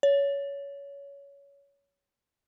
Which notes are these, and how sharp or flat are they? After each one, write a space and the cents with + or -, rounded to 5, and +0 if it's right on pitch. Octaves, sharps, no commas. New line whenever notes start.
C#5 +20